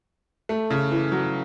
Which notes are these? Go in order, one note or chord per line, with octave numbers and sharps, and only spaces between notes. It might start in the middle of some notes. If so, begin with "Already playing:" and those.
A3
C#3
E3
F#3